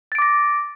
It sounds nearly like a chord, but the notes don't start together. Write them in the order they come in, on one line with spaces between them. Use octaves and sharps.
A6 D7 D6 A#6